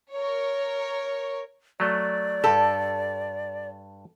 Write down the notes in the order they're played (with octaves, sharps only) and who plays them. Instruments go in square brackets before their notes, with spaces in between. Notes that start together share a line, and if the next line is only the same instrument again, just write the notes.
[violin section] A#4 C#5
[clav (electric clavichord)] F#3 A3 [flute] D5
[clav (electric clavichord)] G2 G4 [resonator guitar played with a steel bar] A4